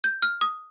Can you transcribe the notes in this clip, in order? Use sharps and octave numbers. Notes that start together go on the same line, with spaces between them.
G6
F6
D#6